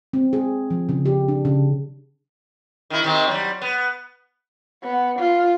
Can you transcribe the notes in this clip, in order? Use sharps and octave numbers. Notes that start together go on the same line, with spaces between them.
C4
G#4
F3
C#3
G4
D4
C#3
D#3 E4
C3 D#3 C4
F#3 G3
B3
B3
F4